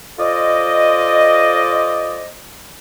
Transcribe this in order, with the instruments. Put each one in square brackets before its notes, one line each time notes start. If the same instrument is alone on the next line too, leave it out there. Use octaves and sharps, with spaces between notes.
[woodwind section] F4 A4 C5 D5 D#5